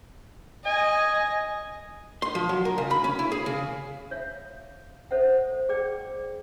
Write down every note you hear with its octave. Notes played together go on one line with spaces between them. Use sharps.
D#5 G#5
C6
F3
F#3
A#4
C#3
B5
C#4
E4
G#4
C#3
C#5 E5 F5
A4 C5 C#5 E5 F#5
G#4 D5 G5